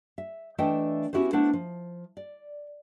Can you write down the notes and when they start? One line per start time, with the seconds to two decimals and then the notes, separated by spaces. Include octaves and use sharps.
0.18 E5
0.58 E3 A3 D4 D#5 E5 G5
1.13 B3 C#4 E4 F#4 G4 C5
1.33 A3 B3 D4 E4 C5 F#5
1.53 F3
2.17 D5